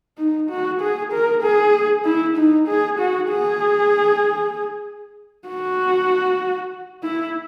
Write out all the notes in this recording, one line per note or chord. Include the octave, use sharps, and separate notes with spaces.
D#4
F#4
G#4
A#4
G#4
E4
D#4
G#4
F#4
G#4
F#4
E4